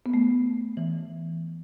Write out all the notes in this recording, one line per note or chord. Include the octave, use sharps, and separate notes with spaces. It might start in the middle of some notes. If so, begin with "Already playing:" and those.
B3
A3
E3